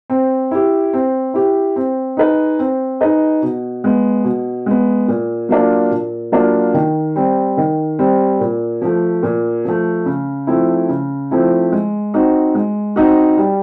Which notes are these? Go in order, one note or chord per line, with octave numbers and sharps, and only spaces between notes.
C4
E4 G4
C4
E4 G4
C4
D#4 G#4 B4 D#5
C4
D#4 G#4 B4 D#5
B2
G#3 B3
B2
G#3 B3
A#2
F#3 A#3 D4 F4
A#2
F#3 A#3 D4 F4
D#3
G3 C4
D#3
G3 C4
A#2
F3 A3
A#2
F3 A3
C#3
F3 A3 C4 E4
C#3
F3 A3 C4 E4
G#3
C4 D#4 F#4
G#3
C4 D#4 F#4
G3